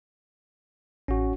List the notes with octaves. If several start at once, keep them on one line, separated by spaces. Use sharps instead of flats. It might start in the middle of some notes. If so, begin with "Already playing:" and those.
A1 C#4 F#4